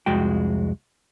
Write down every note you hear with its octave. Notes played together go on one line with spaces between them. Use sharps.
C2 F2 G#3 F#4 G5